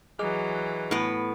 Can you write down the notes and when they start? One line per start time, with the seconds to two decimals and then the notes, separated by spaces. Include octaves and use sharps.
0.19 E3 F#3 G#4 D#5 D6
0.91 A2 B3